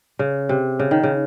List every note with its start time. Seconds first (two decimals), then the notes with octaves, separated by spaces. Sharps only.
0.19 C#3
0.49 C3
0.79 C#3
0.91 D#3
1.03 C#3